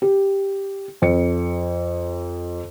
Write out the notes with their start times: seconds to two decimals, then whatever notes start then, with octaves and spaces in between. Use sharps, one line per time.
0.02 G4
1.02 F2 C#7